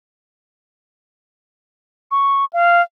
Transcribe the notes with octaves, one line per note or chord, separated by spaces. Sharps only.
C#6
F5